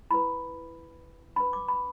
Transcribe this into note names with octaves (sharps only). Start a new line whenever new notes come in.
E4 B4 B5
D4 B4 B5
D6
B5